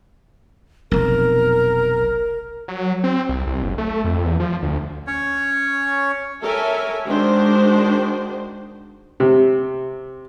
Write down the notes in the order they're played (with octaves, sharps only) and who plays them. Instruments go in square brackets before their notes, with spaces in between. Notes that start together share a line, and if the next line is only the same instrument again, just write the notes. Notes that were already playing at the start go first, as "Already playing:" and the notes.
[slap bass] F1 B1 [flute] A#4
[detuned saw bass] F#3
C4
C2
C2
F#1
A3
F2
E2
F3
D2
[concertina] C#4 C#5
[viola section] A4 A#4 C#5 E5 G#5
D#3 G#3 D4 F#4 C5
[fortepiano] C3